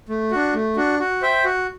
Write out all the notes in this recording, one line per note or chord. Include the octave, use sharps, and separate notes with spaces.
A3
D4 F#4
A3
D4 F#4
F#4
C5 E5 G5
F#4